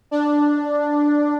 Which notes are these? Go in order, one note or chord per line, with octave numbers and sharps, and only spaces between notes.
D4